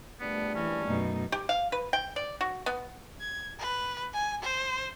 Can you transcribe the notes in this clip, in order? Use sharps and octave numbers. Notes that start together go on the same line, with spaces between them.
A#1 G3 A3 B3 D4
E3 C#4
F#2 B2 A3 D#4
G4
F5
B4
G5
D5
F#4
B3
G#6
B4
G#5
C5